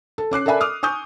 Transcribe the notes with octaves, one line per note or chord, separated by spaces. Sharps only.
A4
C#4 D6 F#6 C7
A4 A#4 D5 E5 G#5 B5
D6 D#6 F6
G#5 C#6 D#6 G6